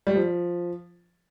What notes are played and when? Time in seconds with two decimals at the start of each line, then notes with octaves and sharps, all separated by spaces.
0.07 G3
0.15 F3